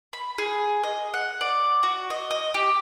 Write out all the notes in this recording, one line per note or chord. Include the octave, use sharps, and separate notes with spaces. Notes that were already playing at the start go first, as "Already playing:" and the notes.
B5
G#4
D#5
F#5
D5
F#4
D#5
D#5
G4